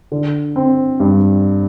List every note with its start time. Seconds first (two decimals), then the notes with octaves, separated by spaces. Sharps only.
0.12 D3
0.56 C4
1.00 G2